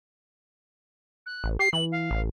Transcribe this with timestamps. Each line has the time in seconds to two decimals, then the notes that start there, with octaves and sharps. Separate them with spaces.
1.26 F#6
1.44 A1
1.59 G4 C7
1.73 E3 F#7
1.91 F5
2.11 A1